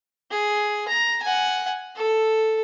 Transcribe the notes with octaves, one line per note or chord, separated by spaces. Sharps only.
G#4
A#5
F#5 G#5
A4